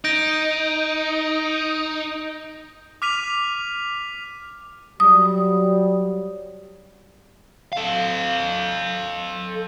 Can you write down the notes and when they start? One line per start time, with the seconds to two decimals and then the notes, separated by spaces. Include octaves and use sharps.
0.04 D#4 G6 A#6 D7
3.02 D6 F6 B6 D#7 F7
5.00 F#3 G3 D#6
7.72 A4 F5